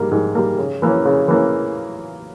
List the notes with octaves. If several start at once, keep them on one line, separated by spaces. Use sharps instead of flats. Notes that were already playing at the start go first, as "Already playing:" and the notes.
Already playing: G#2 G3 A#3
G#2
G3 A#3
C#3
E3 A#3 C#4
C#3
E3 A#3 C#4